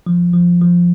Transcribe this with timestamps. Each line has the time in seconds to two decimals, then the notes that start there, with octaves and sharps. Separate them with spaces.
0.06 F3
0.33 F3
0.61 F3